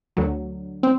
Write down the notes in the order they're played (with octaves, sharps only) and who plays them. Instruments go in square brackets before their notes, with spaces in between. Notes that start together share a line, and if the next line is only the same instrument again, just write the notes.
[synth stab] D2 D3 F#3
C4